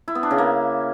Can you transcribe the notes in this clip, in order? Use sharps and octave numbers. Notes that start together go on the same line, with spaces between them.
E4
B3
D4
C#3
A#3